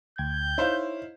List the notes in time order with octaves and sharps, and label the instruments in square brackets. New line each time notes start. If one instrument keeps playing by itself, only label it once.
[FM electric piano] D2 G5 G#6 [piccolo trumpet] G6
[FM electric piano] D#4 [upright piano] E4 C5 F5 [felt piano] C#5